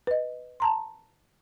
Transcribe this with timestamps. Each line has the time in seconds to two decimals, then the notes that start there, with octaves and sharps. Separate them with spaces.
0.07 B4 D#5
0.60 A5 A#5 C6